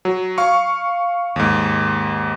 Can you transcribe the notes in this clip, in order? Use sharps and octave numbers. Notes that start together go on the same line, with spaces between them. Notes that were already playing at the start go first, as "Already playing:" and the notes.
F#3
F5 C#6
D#2 G#2